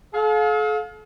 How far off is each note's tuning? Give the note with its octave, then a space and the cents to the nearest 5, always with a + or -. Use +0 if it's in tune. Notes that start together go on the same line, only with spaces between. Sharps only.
A4 -45 F5 +30